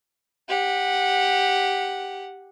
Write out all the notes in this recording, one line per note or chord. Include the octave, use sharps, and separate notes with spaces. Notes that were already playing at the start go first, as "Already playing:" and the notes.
G4 F#5